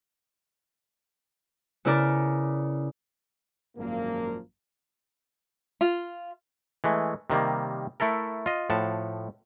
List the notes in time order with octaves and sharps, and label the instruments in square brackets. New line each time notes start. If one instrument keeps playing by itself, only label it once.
[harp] C#3 B3 E4 A#4 D5 F6
[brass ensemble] G#1 F#2 A#2 F3 A#3
[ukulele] F4
[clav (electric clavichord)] E3 G#3 A3
C3 D#3 G3 A#3
A3 E4 A4 A#4
F4 D#5
A2 F3 F#5 A5